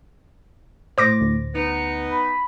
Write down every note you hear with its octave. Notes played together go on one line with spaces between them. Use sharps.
A2 C5 D6 A#6
D2
B3 D#4 C#7
B5